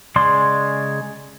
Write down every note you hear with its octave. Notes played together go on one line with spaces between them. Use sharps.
C#3 G#3 D5 C6